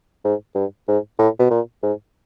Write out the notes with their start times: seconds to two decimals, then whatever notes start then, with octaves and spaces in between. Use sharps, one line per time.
0.25 G#2
0.55 G2
0.88 G#2
1.19 A2
1.39 B2
1.51 A#2
1.83 G#2